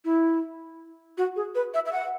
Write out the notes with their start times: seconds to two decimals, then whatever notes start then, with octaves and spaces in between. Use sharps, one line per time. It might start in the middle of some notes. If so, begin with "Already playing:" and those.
0.05 E4
1.18 F#4
1.36 G#4
1.55 B4
1.74 E5
1.85 E5
1.93 F#5